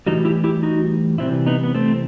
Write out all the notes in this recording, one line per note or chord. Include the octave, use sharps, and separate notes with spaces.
A2 E3 G3 D#4 F#4
E4 G4
E4 G4
D#4 F#4
C3 E3 G3 C4 E4
B3 D#4
B3
A3 C4